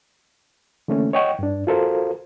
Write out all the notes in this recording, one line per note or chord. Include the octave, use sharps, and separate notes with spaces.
D3 E3 A3 A#3 C#4
C#5 D#5 F#5 G5 C#6
G2 D4
F4 F#4 A4 A#4 C5 F5